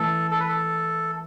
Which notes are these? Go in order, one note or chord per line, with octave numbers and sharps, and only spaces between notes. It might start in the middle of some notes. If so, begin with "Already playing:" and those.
Already playing: E3 A3 A4
A4
B4
A4